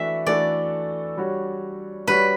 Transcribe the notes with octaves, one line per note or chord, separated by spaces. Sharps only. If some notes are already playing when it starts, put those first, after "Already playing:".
Already playing: E3 A3 D4 F#4 E5
E3 A3 D4 F#4 A4 D5
G3 D4 F#4 C#5
G3 D4 F#4 B4 C#5